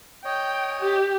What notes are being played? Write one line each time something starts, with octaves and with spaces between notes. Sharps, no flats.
C#5 D#5 G5
G4